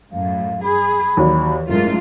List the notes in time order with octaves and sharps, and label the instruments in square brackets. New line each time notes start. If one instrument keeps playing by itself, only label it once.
[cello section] F#2 A2 [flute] F5
[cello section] G#4 [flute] B5
[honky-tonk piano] D#2 F#3 D5 [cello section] E3
[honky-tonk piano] F#1 [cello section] G#2 A3 F4 [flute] A#4